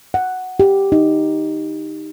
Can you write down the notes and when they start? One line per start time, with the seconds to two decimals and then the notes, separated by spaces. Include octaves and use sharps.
0.14 F#5
0.60 G4
0.92 D#4